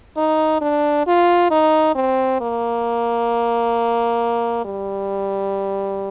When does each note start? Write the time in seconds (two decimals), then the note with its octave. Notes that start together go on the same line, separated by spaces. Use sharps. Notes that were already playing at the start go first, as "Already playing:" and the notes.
0.17 D#4
0.61 D4
1.06 F4
1.51 D#4
1.95 C4
2.41 A#3
4.65 G3